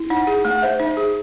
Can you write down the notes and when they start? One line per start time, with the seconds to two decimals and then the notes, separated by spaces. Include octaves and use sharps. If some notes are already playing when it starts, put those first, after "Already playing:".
Already playing: E4
0.10 D#4 F#5
0.27 G#4
0.45 A3
0.51 F#5
0.62 C5 E5
0.80 D#4
0.97 G#4